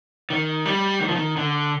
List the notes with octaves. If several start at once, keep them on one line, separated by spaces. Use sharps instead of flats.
D#3
G3
D#3
F3
D#3
D3